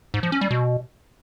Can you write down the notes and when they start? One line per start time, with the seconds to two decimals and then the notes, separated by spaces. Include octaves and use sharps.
0.14 G#2
0.23 F3
0.32 C#4
0.41 G3
0.51 B2